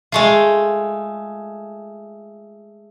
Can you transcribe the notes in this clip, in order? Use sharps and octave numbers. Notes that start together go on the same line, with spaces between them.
G#3 A3 F4